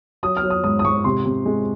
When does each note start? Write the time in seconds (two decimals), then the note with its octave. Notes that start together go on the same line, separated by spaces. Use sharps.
0.23 F#3 D#6
0.37 F6
0.43 F#3
0.50 D#6
0.64 G#2 D#6
0.79 D#6
0.84 G#2 C#6
1.04 C3 C6
1.25 C3
1.45 G#3